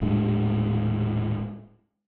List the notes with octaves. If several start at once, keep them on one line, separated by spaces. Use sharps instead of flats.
D#1 A2 G#3 D4